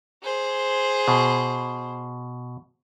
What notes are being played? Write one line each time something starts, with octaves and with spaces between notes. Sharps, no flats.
G#4 C5
B2